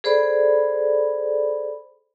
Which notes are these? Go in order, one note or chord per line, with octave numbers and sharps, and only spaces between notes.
G#4 A4 C5 D5 B5